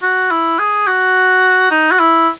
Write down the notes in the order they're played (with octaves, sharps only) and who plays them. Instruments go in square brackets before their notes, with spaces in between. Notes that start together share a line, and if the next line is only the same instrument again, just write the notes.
[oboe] F#4
E4
G#4
F#4
D#4
F#4
E4